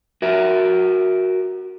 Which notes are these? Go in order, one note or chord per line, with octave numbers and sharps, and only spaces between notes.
F#4 A#4 E5